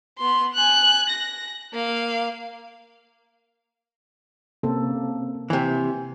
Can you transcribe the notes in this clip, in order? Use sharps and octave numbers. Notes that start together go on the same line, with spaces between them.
B3 C6
G#5 F#6
A#6
A#3 F5
C3 A#3 C4 C#4 A4
C3 E3 G#5